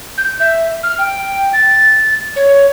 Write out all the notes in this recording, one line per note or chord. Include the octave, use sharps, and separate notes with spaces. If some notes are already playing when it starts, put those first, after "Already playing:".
G6
E5
F6
G5
A6
C#5